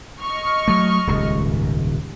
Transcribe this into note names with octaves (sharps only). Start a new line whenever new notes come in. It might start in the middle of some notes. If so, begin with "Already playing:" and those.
D#5 C#6 F6
F#3 A3
D#1 C#2
G#2